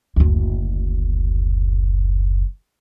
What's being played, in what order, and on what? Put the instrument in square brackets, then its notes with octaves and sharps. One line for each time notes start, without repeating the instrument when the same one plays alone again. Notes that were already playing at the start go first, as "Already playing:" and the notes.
[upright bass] F#1 D2